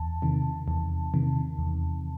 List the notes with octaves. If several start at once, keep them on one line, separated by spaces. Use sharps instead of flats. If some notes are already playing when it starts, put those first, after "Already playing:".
Already playing: E2 A5
C3 D#3
E2
C3 D#3
E2